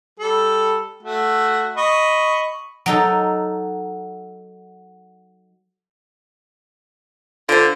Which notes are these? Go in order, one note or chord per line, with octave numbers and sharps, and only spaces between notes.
G3 A4
A3 F#4
D#5 B5 C#6
F#3 D#4 A4
D3 F4 C5